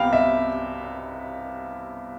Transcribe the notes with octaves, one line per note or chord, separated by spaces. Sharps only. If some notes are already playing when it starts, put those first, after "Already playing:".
Already playing: C2 C3 B3 F5 G5
E5